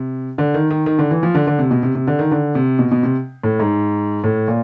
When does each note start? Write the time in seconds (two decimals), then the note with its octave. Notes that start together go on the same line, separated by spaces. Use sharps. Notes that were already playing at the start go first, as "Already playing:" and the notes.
Already playing: C3
0.38 D3
0.54 D#3
0.71 D#3
0.86 D#3
0.99 D3
1.11 E3
1.23 F3
1.35 D3
1.47 D3
1.59 C3
1.71 B2
1.83 C3
1.95 C3
2.07 D3
2.19 D#3
2.31 D3
2.55 C3
2.79 B2
2.91 B2
3.03 C3
3.44 A2
3.60 G#2
4.24 A2
4.48 A#2